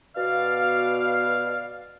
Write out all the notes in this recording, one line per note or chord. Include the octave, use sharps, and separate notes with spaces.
B2 D5 F5